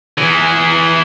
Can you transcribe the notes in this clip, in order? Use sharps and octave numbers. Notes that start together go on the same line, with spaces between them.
E3 G#4